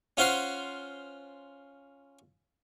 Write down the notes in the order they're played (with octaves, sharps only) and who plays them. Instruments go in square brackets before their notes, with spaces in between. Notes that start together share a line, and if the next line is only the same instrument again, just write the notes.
[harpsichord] C#4 F4 C5 F#5 C6